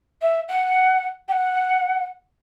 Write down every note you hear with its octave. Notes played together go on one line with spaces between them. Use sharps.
E5
F#5
G5
F#5